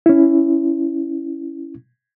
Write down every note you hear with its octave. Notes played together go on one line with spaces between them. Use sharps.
C#4 E4